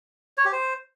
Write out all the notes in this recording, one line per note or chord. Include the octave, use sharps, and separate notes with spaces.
C#5
G4
C5